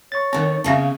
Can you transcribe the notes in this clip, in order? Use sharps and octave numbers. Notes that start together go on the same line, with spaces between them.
C#5 C#6 A6
D3 D#3 C4 A#4
C#3 C4 C#4 E5 F5 A5